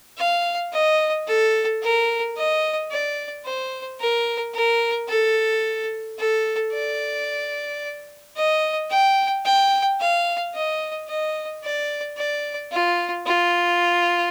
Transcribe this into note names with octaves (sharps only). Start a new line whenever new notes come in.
F5
D#5
A4
A#4
D#5
D5
C5
A#4
A#4
A4
A4
D5
D#5
G5
G5
F5
D#5
D#5
D5
D5
F4
F4